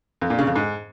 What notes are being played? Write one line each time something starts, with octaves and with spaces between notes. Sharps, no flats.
F2
A#2
C#3
F2
G#2